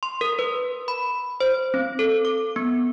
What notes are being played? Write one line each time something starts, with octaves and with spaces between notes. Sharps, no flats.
C6
A#4
B4
B5
C5
C4
A4
D6
B3